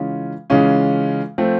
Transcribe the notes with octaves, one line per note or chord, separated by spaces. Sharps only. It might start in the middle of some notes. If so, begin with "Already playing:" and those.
Already playing: C#3 E3 G#3 C#4 F4
C#3 E3 G#3 C#4 F4
F3 A3 C4